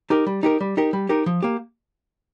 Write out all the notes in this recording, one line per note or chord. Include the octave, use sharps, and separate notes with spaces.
D#4 G4 A#4
G3
D#4 G4 A#4
G3
D#4 G4 A#4
G3
D#4 G4 A#4
F3
A#3 G4